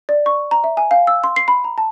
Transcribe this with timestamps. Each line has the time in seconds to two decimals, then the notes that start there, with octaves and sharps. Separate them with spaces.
0.09 D5
0.26 C#6
0.51 A#5
0.64 E5
0.77 G#5
0.91 F5
1.07 E6
1.24 C6
1.36 C7
1.48 B5
1.64 A#5
1.78 A5